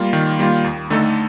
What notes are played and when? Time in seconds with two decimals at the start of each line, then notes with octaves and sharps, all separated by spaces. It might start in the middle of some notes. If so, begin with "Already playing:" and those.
Already playing: G3 A#3 F4
0.13 D#3
0.39 G3 A#3 F4
0.64 D#2
0.90 D3 A3 D#4 A4